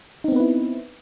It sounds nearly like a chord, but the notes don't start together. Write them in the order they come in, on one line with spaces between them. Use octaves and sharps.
D#4 C4 B3 B4 E4